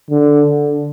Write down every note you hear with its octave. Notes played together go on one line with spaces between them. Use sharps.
D3